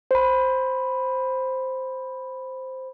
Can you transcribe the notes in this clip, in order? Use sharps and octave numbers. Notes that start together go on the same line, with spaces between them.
C5 B5